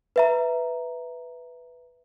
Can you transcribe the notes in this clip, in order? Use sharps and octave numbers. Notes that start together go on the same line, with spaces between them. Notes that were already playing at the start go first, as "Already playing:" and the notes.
B4 E5 A#5